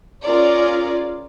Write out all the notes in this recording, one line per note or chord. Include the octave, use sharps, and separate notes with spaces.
C#4 F4 G#4 A#4 C#5 D5